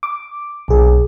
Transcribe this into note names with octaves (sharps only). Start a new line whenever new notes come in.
D6
B1 G#4